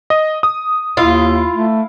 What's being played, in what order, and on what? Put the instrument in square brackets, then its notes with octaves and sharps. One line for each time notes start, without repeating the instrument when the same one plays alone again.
[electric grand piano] D#5
D#6
[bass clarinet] D#2 [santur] E4 F5 [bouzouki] F4
[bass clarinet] A3